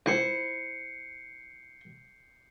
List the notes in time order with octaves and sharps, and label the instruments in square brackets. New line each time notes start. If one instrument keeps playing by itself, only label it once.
[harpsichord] C#2 [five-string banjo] E4 C5 [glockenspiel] G6 C7 C#7